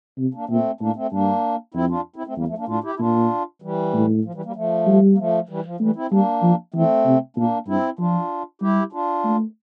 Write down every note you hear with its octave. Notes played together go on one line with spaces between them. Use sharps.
C3
A#3 D4
A#2 A3 C4
A2 A#3 D4
A3 C4
G2 A#3 D4
F2 C4 E4
D4 F4
C4 E4
A3 C4
E2 G3 A#3
F3 A3
A#3 D4
A2 D4 F4
E4 G4
E4
A#2 D4 F4
E3 G3
A2
F3
E3 G3
G3 A#3
F3 A3
G3
A#3
F3 A3
E3 G3
F3
E3 G3 A3
C4 E4
G3 A#3 D4
F3
E3 A3 C4
C3
A#2 A#3 D4
G2 C4 E4
F3 D4 F4
G3 E4 G4
D4 F4
A3